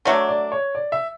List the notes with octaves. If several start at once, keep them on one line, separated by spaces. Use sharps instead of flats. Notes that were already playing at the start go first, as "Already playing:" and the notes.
D3 F#3 A3 D4 C#5
D5
C#5
D5
E5